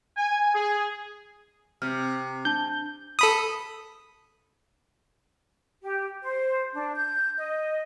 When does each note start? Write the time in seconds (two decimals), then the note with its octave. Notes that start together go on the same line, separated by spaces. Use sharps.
0.17 G#5
0.54 G#4
1.82 C3 F6
2.45 D4 A5 G6
3.19 A4 B5 D#6
5.82 G4
6.22 C5
6.74 D4
6.95 G6
7.37 D#5